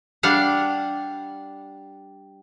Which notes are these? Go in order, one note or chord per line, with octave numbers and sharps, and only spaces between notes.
G3 D4 F5 F#5